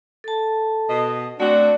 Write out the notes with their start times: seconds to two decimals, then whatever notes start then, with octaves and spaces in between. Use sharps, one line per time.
0.24 A4 A5
0.89 B2 D#5
1.40 A3 C4 D4 F#4